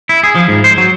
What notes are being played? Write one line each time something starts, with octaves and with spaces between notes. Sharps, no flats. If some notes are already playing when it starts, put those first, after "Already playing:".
E4
G#4
F3
G#2
C5
F#3